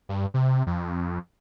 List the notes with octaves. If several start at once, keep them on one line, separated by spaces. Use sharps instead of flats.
G2
C3
F2